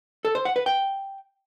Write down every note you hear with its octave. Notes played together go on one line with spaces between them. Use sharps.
A4
C5
F#5
B4
G5